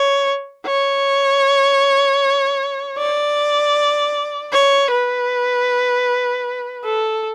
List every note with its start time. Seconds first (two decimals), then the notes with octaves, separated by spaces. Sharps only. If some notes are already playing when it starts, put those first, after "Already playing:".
Already playing: C#5
0.66 C#5
2.98 D5
4.53 C#5
4.91 B4
6.85 A4